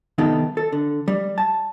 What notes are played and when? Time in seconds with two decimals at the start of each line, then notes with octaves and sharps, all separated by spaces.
0.18 C2 D#3 B3 D#4 G4 A4
0.57 A4
0.72 D3
1.08 G3
1.38 A5